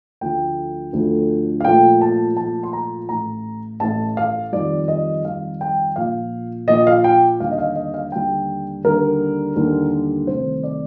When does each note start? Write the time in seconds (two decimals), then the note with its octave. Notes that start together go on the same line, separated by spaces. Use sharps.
0.21 D2 D3 F3 A3 G5
0.93 D2 D3 F3 A3
1.60 F5
1.64 A#1 A#2 F3 A3 G5
2.01 A5
2.37 A#1 A#2 F3 A3 A5
2.63 C6
2.73 A#5
3.09 A1 A2 A3 A#5
3.80 A1 A2 A3 A5
4.17 F5
4.52 F2 D#3 G3 D5
4.88 D#5
5.24 F2 D#3 G3 F5
5.61 G5
5.96 A#1 A#2 F3 F5
6.68 A#1 A#2 F3 D#5
6.87 F5
7.04 G5
7.40 D#2 D3 G3 F5
7.51 D#5
7.58 F5
7.76 D#5
7.94 F5
8.12 D#2 D3 G3 G5
8.84 D#2 D3 G3 A#4
9.56 D#2 D3 G3
10.27 C2 C3 D#3 A3 C5
10.63 D5